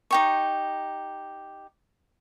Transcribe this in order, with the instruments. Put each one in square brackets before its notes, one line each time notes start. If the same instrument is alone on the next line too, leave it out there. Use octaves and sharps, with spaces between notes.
[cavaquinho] D#4 G4 C#6